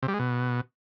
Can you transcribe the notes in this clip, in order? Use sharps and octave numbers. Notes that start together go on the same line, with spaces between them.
C3
G3
G#3
B2